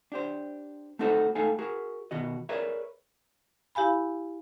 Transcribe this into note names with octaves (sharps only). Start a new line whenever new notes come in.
D4 G4 C5
A3 C4 D#4 F#4 A4 C5
A3 D#4 A4 F5 G5 G#5
F#4 G#4 A#4
B2 D#3 F#4 D#5
G#4 A#4 B4 C#5 D5 E5
E4 G4 F5 G#5 B5